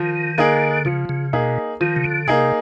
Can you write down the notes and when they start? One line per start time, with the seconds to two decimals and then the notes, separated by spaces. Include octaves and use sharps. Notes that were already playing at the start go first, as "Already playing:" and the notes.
Already playing: D#3 F3
0.38 D3 A#3 D#4 G#4
0.85 C#3 F3
1.09 C#3
1.33 B2 A#3 D#4 G#4
1.81 D#3 F3
1.96 C#3
2.04 D3
2.27 C3 A#3 D#4 G#4